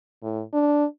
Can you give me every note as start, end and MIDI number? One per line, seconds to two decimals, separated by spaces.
0.23 0.43 45
0.53 0.85 62